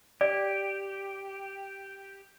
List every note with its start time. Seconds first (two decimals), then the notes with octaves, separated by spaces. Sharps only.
0.21 G4 D5